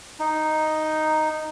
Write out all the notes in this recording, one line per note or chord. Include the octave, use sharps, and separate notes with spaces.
D#4